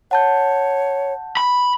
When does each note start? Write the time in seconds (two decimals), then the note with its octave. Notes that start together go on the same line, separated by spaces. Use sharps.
0.11 C#5 F#5 A5 G6
1.37 B5